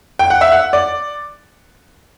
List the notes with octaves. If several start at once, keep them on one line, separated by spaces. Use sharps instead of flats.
G5
F#5
E5
F#5
D5